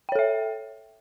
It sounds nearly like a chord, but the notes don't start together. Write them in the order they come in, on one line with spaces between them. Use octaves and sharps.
G5 C#5 A4 E5